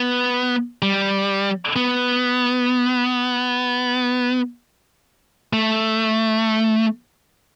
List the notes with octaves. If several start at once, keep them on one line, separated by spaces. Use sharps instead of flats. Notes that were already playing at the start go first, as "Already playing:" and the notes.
Already playing: B3
G3
B3
A3